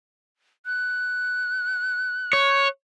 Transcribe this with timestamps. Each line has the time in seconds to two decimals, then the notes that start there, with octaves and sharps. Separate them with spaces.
0.66 F#6
2.33 C#5